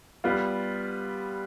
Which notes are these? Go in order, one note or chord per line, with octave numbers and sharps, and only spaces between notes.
G3 B3 F4